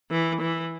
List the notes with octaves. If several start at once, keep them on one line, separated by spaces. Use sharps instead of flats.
E3
E3